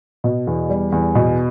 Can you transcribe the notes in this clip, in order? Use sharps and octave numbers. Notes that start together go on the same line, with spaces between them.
B2
E2
G3
E2
B2